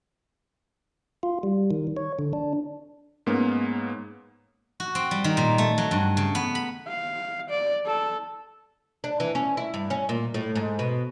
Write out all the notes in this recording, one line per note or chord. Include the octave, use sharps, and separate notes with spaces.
F4
G3
D#3
C#5
D3
D4
G#2 A#3 B3 C#4
F#4
C4
G3
D#3
A#2
A3
F#3
G2
C#3
B3
B5
F5
D5
A4
D4
E3
C#4
E4
G2
C#4
A#2
A2
G#2
B2